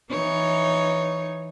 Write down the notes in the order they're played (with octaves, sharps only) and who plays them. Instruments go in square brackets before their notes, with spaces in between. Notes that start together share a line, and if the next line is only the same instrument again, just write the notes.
[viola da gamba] E3 D#4 C#5